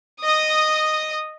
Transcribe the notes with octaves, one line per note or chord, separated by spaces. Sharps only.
D#5 D#6